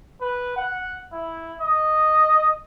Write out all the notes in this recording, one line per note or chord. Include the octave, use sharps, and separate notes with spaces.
B4
F#5
E4
D#5